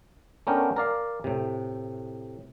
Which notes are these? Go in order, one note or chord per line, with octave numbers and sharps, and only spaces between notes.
A3 B3 C#4 D4 A#4 G5
A#4 D5 F5
A2 C3